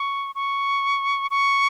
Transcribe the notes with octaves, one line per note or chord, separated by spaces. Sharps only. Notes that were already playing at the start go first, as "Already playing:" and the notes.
Already playing: C#6
C#6
C#6